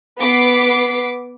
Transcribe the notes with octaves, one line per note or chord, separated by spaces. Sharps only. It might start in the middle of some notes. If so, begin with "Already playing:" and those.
B3 D6 B6 C7